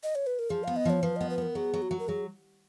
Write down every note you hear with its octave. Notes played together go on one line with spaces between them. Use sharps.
D#5
C#5
B4
A#4
F3 G#4
B3 F5
D#5
F3 C#5
F3 B4
B3 D#5
B4
B3 A#4
F#3 G#4
F#3
F#4
F#3
A#4
F#3 G#4